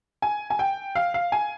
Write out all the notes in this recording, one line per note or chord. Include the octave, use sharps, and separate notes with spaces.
G#5
G#5
G5
F5
F5
G#5